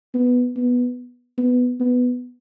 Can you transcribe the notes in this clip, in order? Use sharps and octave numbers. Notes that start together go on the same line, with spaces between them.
B3
B3
B3
B3